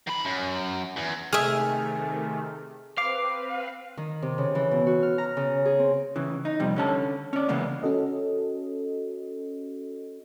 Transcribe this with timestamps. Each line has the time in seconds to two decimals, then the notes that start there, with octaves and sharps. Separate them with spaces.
0.07 D#3 B5
0.24 F#2
0.96 E2
1.33 C3 D#3 A3 G#4 E5 G#5 F6
2.98 C4 B4 F5 D6
3.97 D#3
4.22 C3
4.38 C#3
4.55 E3
4.71 B2
4.87 F#4
5.03 F6
5.18 A#5
5.37 C#3
5.66 G#4
5.79 C4
6.16 C#3 E3
6.45 D#4
6.60 F2 C3 G3
6.76 D3 C#4 A5
7.33 C#4 D5
7.49 C#3 E3 G#3 A#3 B3
7.83 C#4 F#4 A4 D#5